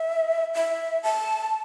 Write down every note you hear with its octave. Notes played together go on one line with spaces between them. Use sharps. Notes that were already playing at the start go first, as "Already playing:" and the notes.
Already playing: E5
E5
A5